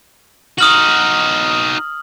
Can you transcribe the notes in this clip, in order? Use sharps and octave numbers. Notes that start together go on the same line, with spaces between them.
D#4 F#4 D#6 F6 F#7